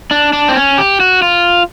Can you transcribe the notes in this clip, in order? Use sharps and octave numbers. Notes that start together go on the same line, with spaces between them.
D4
D4
C4
C#4
G4
F#4
F4